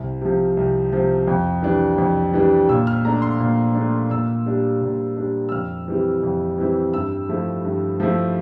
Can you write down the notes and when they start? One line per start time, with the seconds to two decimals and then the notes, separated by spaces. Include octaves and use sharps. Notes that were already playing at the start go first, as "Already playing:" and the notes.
Already playing: C2
0.21 C3 F3
0.57 C2
0.92 C3 F3
1.28 F2
1.62 E3 G3 D4
1.98 F2
2.33 E3 G3 D4
2.69 A#2 E6
2.87 F6
3.04 A3 D4 A#5
3.22 C6
3.40 A#2
3.75 A3 D4
4.10 A#2 E6
4.46 G3 D4
4.81 A#2
5.17 G3 D4
5.49 E6
5.52 F2 F6
5.88 E3 G3 C4 E4
6.23 F2
6.58 E3 G3 C4 E4
6.94 G2 E6
7.29 F3 A3 E4
7.65 G2
8.00 F3 A3 E4